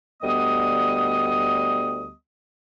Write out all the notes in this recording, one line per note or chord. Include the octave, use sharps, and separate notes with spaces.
D2 G3 B3 D#5 D#6